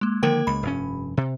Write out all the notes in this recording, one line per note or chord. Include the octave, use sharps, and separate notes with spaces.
G#3 A#3
D3 D#3 F3 A#3 A#4 G5
C#2 B5
F1 G2 C#4
C3